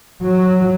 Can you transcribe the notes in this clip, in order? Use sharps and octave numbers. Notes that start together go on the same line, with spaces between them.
F#3